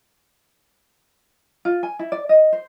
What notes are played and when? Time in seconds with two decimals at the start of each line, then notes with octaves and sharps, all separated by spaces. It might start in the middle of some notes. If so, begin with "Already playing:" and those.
1.65 F4
1.83 G#5
1.99 E4
2.12 D5
2.29 D#5
2.53 C5